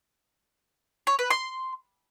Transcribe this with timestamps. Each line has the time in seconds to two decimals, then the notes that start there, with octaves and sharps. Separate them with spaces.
1.07 C#5
1.19 B4
1.30 C6